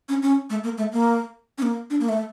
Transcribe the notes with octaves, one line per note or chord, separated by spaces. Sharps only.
C#4
C#4
A3
A#3
A3
A#3
C#4
A#3
D4
A#3
A3